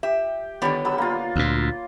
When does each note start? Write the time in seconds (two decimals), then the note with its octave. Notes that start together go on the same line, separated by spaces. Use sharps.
0.03 G4 E5
0.62 D3 D#3 G3 B3 C#5 D5
0.85 F#3 G3 E6
0.98 A#3 F4
1.36 D2 A#2